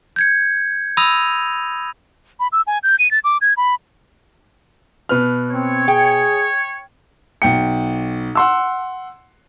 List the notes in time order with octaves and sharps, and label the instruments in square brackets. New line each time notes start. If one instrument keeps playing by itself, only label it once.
[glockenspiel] G6 G#6 C#7
B5 D#6 E6 A#6 D#7 F7
[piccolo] B5
E6
G#5
G6
D#7
A6
D6
G#6
B5
[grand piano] B2 B4 F6
[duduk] C4 [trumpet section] C#5
[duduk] G#4 [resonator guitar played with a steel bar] G5
[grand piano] B1 G5 C#7
F#5 C6 E6